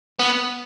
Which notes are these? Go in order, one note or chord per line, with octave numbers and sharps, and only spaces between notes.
B3